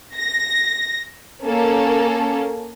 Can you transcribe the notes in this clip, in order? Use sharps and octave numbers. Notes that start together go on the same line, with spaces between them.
A#6
A#3 C#4 A4